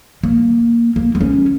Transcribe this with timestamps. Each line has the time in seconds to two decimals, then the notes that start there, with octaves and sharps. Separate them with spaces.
0.23 A#3
0.96 A#3
1.15 A#3
1.21 C#4